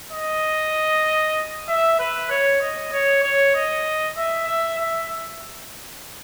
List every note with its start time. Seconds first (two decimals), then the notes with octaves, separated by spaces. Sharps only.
0.12 D#5
1.68 E5
1.99 B4
2.30 C#5
2.61 D#5
2.92 C#5
3.23 C#5
3.55 D#5
4.17 E5
4.48 E5
4.79 E5